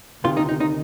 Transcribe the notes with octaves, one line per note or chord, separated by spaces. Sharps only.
D2 C3 D#3 F4
D#4
D#4
D#4